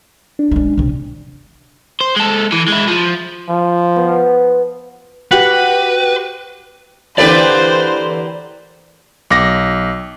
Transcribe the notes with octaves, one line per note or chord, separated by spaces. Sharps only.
D4
G#3 C#4
C3 C#4
C5
G#3 A4
E3
G#3 E4
F3
F3
B3
F#4 G4 B4 F#5
D3 E3 A#3 G4 A4 B4 C5 D5
B1 D6 A#6